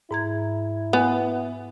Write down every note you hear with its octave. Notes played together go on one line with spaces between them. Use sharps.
G#2 E4 A#5 G#6
B3 G#5